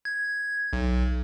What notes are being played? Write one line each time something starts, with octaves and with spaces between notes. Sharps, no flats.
G#6
B1